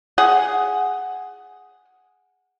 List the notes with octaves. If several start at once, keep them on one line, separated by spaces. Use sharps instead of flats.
G#4 F#5